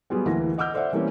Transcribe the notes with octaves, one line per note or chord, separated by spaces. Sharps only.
F#3 G3 B3 F4 G#4
D2 E3 A#3 A#6
D#5 F#5 D6 E6 F6 G6
A4 C5 D5 E5 F#5
E3 G3 A3 A#3 C4 C#4